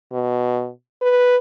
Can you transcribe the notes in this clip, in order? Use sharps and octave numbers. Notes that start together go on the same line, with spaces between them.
B2
B4